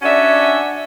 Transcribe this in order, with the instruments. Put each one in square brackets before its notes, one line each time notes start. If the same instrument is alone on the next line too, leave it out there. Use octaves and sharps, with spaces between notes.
[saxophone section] C#4 D4 F#4 D5 E5